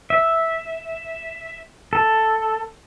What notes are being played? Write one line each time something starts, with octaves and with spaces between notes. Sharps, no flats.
E5
A4